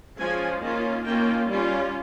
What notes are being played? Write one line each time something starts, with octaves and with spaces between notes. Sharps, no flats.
F3 G#3 C#4 F4 G#5
D#3 A#3 C#4 F4
D#3 A#3 C#4 F4 G5
G3 C#4 F4